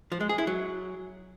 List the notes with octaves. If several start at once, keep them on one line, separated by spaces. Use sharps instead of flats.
F3
G#3
G#4
E4
F#3